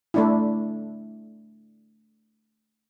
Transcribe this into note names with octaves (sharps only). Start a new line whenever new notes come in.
A3 D4 E4